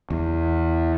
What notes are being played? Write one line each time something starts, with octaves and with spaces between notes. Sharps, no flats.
E2